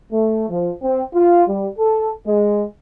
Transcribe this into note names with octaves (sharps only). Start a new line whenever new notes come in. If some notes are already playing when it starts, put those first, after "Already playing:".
A3
F3
C4
F4
G3
A4
G#3